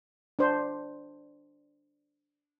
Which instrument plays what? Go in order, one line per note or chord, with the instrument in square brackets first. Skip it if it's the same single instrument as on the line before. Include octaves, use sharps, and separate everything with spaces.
[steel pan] D4 C5